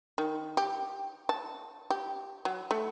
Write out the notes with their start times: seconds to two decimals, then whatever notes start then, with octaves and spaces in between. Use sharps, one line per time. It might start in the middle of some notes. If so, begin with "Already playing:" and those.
0.18 D#3
0.57 G4
1.29 A5
1.90 G4
2.45 F#3
2.71 A3